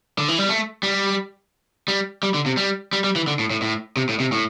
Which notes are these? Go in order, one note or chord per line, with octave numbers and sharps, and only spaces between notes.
D3
E3
G3
A3
G3
G3
G3
D3
C3
G3
G3
G3
E3
D3
A2
A2
A2
C3
A2
C3
A2